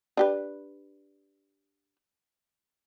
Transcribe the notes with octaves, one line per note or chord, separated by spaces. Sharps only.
D4 G4 B4